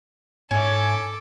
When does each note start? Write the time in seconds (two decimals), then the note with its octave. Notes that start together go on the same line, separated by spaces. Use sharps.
0.51 G#2 C#4 E4 A4 D6